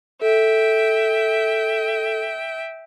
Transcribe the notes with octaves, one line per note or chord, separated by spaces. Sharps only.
A4 E5 G5